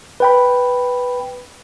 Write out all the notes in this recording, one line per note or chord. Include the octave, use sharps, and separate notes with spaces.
B4 G5 B5